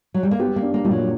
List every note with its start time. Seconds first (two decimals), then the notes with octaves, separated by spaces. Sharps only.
0.14 F#3
0.23 G3
0.31 A#3
0.40 B3 G4
0.56 A#3
0.62 D4
0.74 A#3
0.85 A#2 G3
0.91 F#3